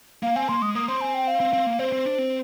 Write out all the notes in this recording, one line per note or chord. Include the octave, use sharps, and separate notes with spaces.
A#3 F5
C4 G#5
A#3 C6
G#3 D#6
A#3 D#6
C4 C6
G#5
G5
F5
C4
C4
A#3
C4 C5
C4
D4
C4